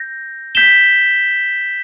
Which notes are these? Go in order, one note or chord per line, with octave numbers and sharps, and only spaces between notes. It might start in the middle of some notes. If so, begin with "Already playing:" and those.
Already playing: G6 A#6
G6 B6 E7 G7